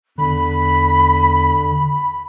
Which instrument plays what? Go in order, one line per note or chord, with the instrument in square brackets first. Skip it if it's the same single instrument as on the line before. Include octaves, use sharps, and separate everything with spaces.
[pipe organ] E2 [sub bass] D3 [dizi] B5